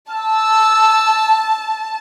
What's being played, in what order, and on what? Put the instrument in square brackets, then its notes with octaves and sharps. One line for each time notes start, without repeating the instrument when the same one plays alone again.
[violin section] A5 [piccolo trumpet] E6